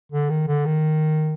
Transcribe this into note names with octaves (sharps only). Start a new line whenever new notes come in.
D3
D#3
D3
D#3